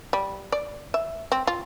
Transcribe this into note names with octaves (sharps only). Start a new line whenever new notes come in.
G3
D5
E5
C4
F4